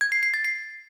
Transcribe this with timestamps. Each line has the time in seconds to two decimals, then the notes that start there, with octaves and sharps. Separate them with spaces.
0.01 G#6
0.12 C7
0.23 C7
0.34 A6
0.45 C7